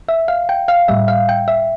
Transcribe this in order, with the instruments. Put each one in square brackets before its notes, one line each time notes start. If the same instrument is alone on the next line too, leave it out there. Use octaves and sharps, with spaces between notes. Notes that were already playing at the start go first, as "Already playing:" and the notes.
[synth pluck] E5
F5
G5
F5
A2 G3 E5
F5
G5
E5